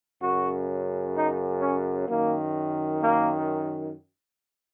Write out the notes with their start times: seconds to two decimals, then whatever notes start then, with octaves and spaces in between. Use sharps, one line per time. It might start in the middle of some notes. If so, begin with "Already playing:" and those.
0.21 F#2 C#3 F#4
1.14 D#4
1.61 C#4
2.08 F#2 D#3 A#3
3.01 A#3